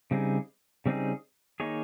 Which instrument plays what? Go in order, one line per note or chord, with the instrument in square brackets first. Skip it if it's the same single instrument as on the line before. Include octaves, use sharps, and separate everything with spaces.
[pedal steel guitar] C#3 G3 C4 D#4 G#4
C#3 G3 C4 D#4 G#4
D#3 A#3 D#4 G#4 C#5